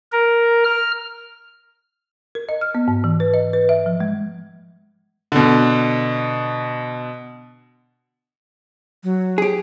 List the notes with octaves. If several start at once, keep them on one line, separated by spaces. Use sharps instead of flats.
A#4
F6
A#4
D#5
F6
B3
G#2
E3
B4
D#5
B4
E5
F3
G#3
B2 D3
F#3
G4 G#4